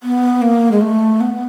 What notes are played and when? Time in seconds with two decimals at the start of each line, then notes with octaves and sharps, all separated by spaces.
0.03 B3
0.42 A#3
0.72 G#3
0.81 A3
1.21 B3